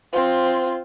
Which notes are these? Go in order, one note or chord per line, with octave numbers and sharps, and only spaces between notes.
C4 F4